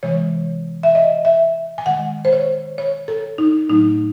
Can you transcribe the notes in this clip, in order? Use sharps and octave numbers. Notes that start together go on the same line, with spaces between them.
C3 E3 G#3 C#5
E5
D#5
E5
G#5
D#3 G#3 F#5
C5
C#5
C#5
A4
D#4
A2 F#3 A3 D#4